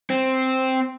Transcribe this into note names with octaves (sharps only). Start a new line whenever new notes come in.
C4